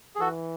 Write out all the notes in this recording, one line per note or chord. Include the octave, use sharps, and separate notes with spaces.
G#4
E3 F#4 A4